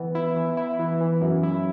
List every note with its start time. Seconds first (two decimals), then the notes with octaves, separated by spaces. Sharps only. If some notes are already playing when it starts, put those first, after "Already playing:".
Already playing: E3 B3
0.15 E4
0.36 E3
0.57 E4
0.79 E3
1.01 E3
1.22 F#2
1.43 E4